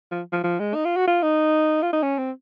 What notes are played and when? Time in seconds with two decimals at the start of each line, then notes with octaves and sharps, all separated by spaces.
0.12 F3
0.33 F3
0.44 F3
0.60 G#3
0.75 D#4
0.85 F4
0.96 F#4
1.08 F4
1.22 D#4
1.83 F4
1.93 D#4
2.03 C#4
2.18 C4